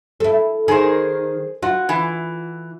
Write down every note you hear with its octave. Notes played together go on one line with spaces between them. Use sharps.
E4 A4
D#3 G#4 C5
F4 F#4
E3